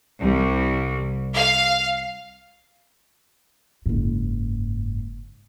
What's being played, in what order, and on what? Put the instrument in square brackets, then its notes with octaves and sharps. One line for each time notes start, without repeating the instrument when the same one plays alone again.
[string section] C2
F5
[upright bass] F#1 G#2